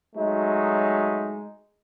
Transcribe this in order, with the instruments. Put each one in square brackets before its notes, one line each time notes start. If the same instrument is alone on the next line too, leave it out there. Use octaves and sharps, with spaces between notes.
[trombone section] F#3 G#3 A3 D#4